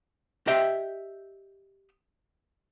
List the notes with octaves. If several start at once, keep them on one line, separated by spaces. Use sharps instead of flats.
G4 D#5 E5 G5